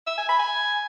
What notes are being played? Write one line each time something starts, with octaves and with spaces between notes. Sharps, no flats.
E5
G#5
B5
G#5